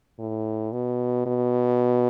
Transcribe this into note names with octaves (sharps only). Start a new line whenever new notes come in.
A2
B2
B2